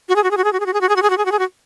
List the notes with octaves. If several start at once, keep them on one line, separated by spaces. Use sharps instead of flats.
F#4
G#4
F#4
G#4
F#4
G#4
F#4
G#4
F#4
G#4
F#4
G#4
F#4
G#4
F#4
G#4
F#4
G#4
F#4